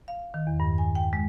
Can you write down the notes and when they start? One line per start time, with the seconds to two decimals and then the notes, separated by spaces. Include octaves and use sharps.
0.08 F5
0.34 D#3
0.47 E2
0.60 G2
0.78 G#5
0.95 G5
1.13 G#3